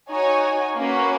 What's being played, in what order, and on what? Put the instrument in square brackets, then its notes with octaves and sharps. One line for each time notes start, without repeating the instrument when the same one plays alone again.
[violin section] D#4 F#4 C#5 G#5
A#3 C#4 F#4 B4